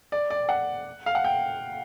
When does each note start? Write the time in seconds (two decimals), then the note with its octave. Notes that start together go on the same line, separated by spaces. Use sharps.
0.12 D5
0.30 D5
0.49 F#5
1.06 F5
1.15 F#5
1.24 G5